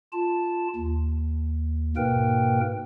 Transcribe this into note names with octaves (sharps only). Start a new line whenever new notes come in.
F4 A5
D#2
G#2 B2 A#3 A#4 B4 G5